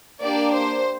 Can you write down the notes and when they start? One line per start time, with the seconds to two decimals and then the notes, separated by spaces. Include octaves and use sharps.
0.22 A#3 D4 G4 D5
0.54 C5